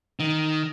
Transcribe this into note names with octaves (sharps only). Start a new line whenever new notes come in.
D#3